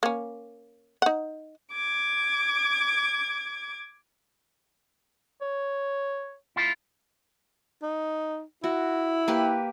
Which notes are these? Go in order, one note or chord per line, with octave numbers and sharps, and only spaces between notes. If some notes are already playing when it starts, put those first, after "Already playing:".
A#3 C#4
D#4 F#5
D6 G#6
C#5
E4 F4
D#4
E4 F#4
A#3 G4 B4